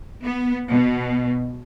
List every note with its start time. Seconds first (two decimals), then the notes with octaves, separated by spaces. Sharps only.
0.23 B3
0.71 B2